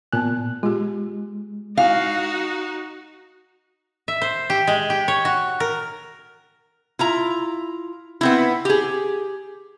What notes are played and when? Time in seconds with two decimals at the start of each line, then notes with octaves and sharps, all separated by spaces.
0.13 A#2 B3 G#5 F#6
0.63 G#3 F4 G4
1.77 D#4 E4 F#4 F5 G#5
4.08 E5
4.22 C5
4.50 G4
4.67 G#3
4.90 G4
5.08 C#5
5.25 F#4
5.60 A#4
6.99 E4 F4 A#5
8.21 B3 C4 E4
8.65 G4 G#4